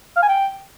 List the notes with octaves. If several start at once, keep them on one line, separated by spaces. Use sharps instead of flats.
F5
G#5
G5